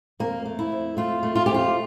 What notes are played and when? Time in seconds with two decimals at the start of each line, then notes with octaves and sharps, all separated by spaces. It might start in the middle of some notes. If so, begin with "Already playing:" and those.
0.19 F2 A#3
0.45 A3
0.59 E4
0.72 F2
0.97 A3 F4
1.23 A3
1.35 F4
1.46 F2 G4
1.54 F4